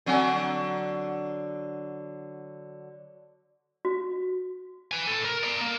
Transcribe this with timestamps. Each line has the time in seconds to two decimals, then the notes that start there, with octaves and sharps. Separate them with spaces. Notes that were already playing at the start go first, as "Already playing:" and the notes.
0.06 D3 F#3 C4 F#5 G#5
3.85 F#4
4.91 B4 G#5
5.07 A2 A4
5.25 A#4
5.44 D5 A#5
5.61 A#3